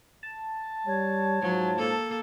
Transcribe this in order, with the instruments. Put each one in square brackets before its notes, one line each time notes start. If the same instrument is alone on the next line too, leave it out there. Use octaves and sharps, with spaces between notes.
[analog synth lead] A5
[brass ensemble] G3 [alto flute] C#5
[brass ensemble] G#2 F4 C5 [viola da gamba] F#3
[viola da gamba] A#3 A4